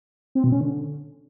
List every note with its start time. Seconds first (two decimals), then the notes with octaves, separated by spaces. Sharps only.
0.35 C4
0.44 B2
0.52 C#4
0.61 D3